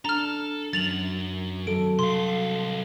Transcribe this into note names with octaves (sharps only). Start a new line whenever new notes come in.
D4 A4 A#5 F6
F#2 A6 F7 F#7
F#3 A4 D7
C2 F5 C6